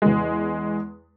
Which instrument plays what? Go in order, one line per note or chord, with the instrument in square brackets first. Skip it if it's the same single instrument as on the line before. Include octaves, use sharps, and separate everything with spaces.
[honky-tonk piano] E2 G#3